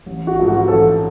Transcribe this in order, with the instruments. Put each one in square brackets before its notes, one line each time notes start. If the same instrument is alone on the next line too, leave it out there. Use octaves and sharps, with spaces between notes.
[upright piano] A1
[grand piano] F#4
[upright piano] G#2 F3 A3 F4
[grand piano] F#4
[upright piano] A1 [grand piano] A4